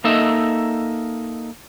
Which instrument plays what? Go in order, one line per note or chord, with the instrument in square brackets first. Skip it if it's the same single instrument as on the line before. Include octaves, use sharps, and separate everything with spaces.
[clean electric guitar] A#3 D#4 A4 D#5 E5